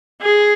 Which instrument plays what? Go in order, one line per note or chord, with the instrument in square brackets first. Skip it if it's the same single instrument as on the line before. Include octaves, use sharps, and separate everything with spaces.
[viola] G#4